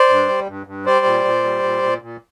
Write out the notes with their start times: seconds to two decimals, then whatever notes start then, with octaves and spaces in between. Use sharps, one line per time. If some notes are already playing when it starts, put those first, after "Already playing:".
Already playing: C5 D5
0.09 G2
0.28 G3
0.47 G2
0.66 G2
0.85 G3 C5 D5
1.05 A#2
1.25 A#2
1.44 G3
1.63 A#2
1.83 A#2
2.02 A#2